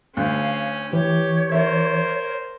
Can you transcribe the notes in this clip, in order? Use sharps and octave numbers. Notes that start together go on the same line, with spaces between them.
D2 C#4 F5
E3 G4 C#5
A#4 C5 E5